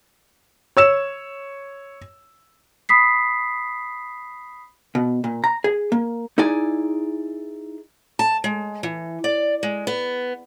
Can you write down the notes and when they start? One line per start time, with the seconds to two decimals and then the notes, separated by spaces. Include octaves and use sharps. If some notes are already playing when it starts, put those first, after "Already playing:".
0.77 C#5 E6 E7
2.89 B5 D#6 B6 C7
4.95 B2
5.24 A#2
5.44 A#5
5.64 G#4
5.92 A#3
6.38 D#4 E4 G#4 D5 G#5
8.19 A5
8.44 G#3
8.83 E3
9.24 D5
9.63 G#3
9.87 B3